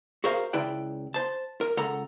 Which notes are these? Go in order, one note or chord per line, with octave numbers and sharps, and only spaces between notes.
F#4 G#4 A#4 C5 F5
C#2 E4 B4 D5 G5
C5 A5
A#4
C#2 A4 F#5 A#5